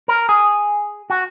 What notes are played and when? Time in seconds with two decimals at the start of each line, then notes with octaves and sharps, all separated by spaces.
0.08 A#4
0.29 G#4
1.10 F#4